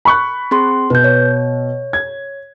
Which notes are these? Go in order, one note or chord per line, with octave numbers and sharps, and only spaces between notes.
B5 C#6 F#6
C4 G#4 C6
B2 B4 G6
C#5
G#6